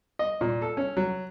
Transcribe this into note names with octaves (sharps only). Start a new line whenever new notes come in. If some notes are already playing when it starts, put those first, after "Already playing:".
D#5
A#2
A4
C#4
F#3